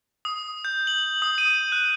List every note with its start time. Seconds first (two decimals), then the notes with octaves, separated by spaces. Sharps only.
0.25 D#6
0.65 G6
0.87 F#7
1.22 D#6
1.38 D#7
1.72 F#6